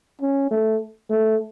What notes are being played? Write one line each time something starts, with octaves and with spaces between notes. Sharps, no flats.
C#4
A3
A3